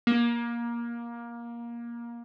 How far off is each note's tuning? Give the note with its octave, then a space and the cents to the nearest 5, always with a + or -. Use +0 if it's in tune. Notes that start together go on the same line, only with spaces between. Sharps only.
A#3 +20